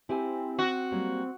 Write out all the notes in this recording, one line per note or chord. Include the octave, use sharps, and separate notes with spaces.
C4 E4 G4 G#5
C4 F#4
F#3 G3 A#3